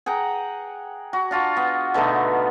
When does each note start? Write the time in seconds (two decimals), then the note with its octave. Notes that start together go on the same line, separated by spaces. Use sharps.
0.06 G#4 F#5 G5 A#5
1.13 F#4
1.31 D4 F4 F#4
1.57 B3
1.94 B2 D3 A3 D#4